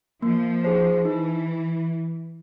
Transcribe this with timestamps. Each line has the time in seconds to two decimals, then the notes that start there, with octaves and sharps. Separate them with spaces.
0.22 F3 A#3
0.64 D#4 G#4 C5
1.05 E3 D#4